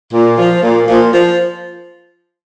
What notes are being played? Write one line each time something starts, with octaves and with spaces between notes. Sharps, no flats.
A#2
F3
A#2
A#2 F3
F3